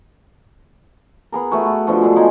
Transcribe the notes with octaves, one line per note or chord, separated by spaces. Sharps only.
B3 G#4 A#4
A3 B3 F#4 G#4
A3
B2 D3 F3 F#4
D3 G#3 G#4
G#3 D#4 G#4